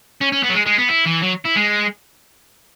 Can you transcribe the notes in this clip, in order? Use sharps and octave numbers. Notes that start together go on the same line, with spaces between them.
C#4
C#4
B3
F#3
G#3
G#3
B3
E4
E3
F#3
E4
G#3